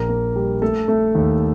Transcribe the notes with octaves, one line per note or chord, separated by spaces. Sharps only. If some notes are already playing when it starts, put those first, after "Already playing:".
Already playing: A#1 A#4 A#5
A#3
G3
A3 A4 A5
A3
D#2